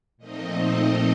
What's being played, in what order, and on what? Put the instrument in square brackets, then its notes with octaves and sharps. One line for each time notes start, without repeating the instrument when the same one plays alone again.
[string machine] A#2 F3 A3 C4 D#4 D#5